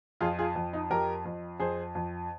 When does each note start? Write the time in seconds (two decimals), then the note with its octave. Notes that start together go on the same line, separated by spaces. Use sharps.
0.21 F2 F4 G#4
0.39 F4 G#4
0.56 F2
0.73 D#4
0.90 F2 G4 A#4
1.25 F2
1.60 F2 G#4 C5
1.95 F2